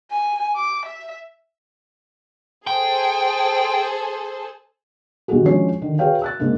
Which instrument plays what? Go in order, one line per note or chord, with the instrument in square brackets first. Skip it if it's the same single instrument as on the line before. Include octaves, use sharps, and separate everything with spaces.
[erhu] G#5
D6
E5
[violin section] G#4 A4 C5 [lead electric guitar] G5
[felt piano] B1 D3 D#3 G3 F#4 G#4
F3 G#3 C#4 D4 C#5 C7
D3 D#3
F#4 G#4 B4 C#5 F5 G5
E6 F#6 A6
G#2 C#3 A#3 D4